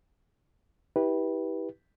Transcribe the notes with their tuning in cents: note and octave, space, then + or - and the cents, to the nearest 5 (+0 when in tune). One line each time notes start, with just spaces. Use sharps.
E4 -35 G4 +0 B4 -15